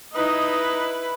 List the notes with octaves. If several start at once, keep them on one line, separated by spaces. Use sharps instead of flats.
D#4 E4 B4 D#5